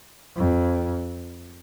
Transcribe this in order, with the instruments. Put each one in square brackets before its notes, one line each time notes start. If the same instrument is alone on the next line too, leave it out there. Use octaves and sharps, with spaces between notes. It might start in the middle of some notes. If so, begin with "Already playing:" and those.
[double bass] F2